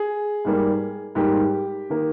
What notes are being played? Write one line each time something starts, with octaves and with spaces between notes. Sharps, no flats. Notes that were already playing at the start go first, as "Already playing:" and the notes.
Already playing: G#4
G#2 G3 A#3
G#2 G3 A#3 G4
D#3 A#3